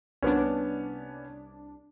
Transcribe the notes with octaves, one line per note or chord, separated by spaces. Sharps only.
C2 B3 C#4 D4